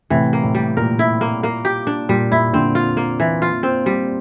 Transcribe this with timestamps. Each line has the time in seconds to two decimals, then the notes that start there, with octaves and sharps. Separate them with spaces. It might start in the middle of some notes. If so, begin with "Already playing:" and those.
0.10 A2 C3 E3
0.33 A#3
0.43 A2
0.55 G3
0.77 A#2 A#4
0.99 E4
1.21 A#3
1.43 A#3
1.65 G4
1.87 D4
2.09 A#2 G3
2.31 A#2 E4
2.53 A#2 D3 C4
2.75 F4
2.97 A#3
3.20 E3
3.42 F4
3.63 C4
3.86 G3